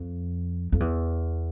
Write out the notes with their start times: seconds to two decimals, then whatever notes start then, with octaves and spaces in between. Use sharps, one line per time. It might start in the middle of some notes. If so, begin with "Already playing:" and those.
Already playing: F2
0.72 F2
0.80 E2